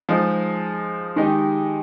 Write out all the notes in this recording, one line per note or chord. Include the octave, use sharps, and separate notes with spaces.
F3 G#3 D#4
D#3 G#3 D#4 G4